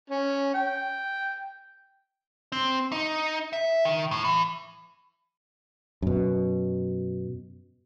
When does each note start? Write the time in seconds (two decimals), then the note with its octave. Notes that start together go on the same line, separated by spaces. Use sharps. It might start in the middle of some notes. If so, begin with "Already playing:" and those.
0.10 C#4
0.54 G5
2.52 C4
2.92 D#4
3.53 E5
3.85 D#3
4.11 A2
4.24 E3
6.02 F#2 B2